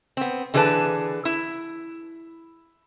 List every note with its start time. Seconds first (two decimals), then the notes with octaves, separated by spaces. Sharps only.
0.17 B3 C4
0.54 D3 E3 G#4 A4 B4 A5
1.25 E4